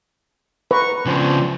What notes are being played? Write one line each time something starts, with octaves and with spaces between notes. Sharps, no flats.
B4 A#5 C#6
C#3 F3 C4 D4 C5